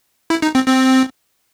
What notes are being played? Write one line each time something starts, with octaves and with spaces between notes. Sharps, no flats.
E4
D#4
C4
C4